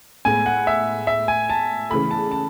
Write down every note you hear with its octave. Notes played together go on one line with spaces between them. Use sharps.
A2 G#3 B3 G#5
F#5
E5
E5
G#5
A5
C#3 E3 A3 B5
A5
A5